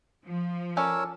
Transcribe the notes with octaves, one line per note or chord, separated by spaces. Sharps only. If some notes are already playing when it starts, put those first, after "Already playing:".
F3
C#4 A4 A#4 C#5 D5 E6